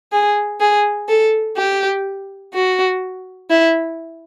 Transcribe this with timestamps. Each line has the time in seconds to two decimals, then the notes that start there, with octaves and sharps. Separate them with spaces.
0.12 G#4
0.60 G#4
1.09 A4
1.57 G4
2.54 F#4
3.50 E4